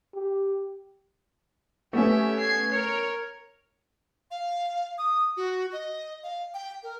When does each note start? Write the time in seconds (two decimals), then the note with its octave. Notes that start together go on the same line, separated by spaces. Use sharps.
0.15 G4
1.93 A3 B3 C#4 G4 E5
2.40 G#6 C7
2.72 A#4 C#5
4.31 F5
4.98 D#6
5.37 F#4
5.73 D#5
6.24 F5
6.54 G5
6.83 A#4